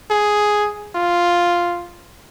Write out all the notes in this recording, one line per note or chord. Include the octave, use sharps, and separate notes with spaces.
G#4
F4